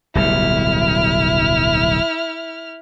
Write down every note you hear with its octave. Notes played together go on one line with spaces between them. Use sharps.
D1 B1 G3 E4 F6